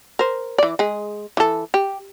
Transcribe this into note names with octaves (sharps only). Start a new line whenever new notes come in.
A#4 C5
E3 D5
G#3 G#4
E3 A4
G4